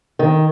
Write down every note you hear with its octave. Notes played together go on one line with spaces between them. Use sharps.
D#3